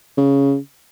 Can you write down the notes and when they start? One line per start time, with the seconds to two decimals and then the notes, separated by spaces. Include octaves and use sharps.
0.18 C#3